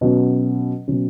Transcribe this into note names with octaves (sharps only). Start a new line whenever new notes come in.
B2 F#3 C#4
B2 F#3 C#4